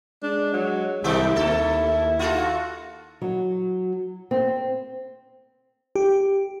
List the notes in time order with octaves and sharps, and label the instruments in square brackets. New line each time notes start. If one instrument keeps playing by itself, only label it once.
[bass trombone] G#3 [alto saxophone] D4
[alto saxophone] F#3
[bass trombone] C2 [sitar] D#3 G#3 G4 [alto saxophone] E4
[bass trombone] D#2 [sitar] A3 A4
[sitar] F4 F#4 A4
[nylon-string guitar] F#3
C4
[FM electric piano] G4